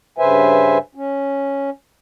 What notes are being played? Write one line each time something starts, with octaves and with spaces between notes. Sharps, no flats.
G2 C#3 B4 C5 E5 G#5
C#4